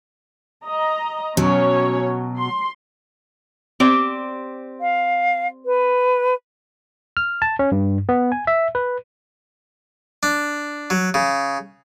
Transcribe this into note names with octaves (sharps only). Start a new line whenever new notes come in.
D#5 A#5
B2 F#3 C#4 C#5
C6
C4 G4 D5
F5
B4
F6
A5
C#4
G2
B3
G#5
E5
B4
D4
F#3
C#3